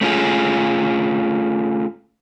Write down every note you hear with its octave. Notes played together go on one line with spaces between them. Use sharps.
A3 C#4 F4 G#4